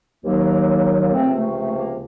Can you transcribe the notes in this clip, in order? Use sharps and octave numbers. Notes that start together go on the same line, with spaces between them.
D#2 D#3 F#3 A#3
A#3
C#2 C3 F3 A3 C4
A3
A3
A3
A#3